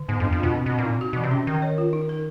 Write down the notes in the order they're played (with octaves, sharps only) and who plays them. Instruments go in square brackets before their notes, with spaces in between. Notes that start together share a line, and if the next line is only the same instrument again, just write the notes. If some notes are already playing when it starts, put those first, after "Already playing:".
Already playing: [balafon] D3
[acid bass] G#2 [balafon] B3
[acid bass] F2
[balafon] D4
[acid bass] F2
[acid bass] B2 [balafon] F4
[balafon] C4
[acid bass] B2 [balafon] C4
[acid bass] A#2
[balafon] D#4
F#4
[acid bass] B2 [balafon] E3
[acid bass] C3
[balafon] C#4
[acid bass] D#3 [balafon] A#4
[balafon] C#5
F4
D#4
A#4